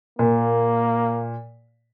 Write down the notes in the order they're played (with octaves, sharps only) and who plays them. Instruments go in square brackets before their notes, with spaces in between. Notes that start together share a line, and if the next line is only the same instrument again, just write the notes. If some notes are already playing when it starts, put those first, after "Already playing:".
[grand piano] A#2 [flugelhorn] A#3